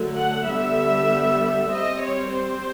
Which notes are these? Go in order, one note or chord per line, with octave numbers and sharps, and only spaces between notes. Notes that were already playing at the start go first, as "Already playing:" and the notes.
Already playing: D3 F#3 A3
F#5
D3 G3 B3 E5
G3 C4 D#5
C#5
C5